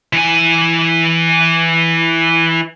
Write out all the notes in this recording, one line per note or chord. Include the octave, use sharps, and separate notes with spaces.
E3 G#5